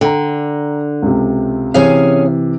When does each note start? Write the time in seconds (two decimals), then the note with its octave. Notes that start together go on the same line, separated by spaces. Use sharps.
0.01 D3 G5 A#5
1.02 C#2 C3
1.74 C3 E3 C#4 G#4 F5